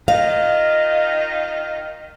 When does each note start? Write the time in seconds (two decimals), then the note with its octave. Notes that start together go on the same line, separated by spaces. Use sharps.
0.08 D#3 F4 D#5 F5